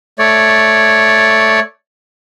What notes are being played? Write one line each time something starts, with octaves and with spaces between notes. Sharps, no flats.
A3 C#5 D5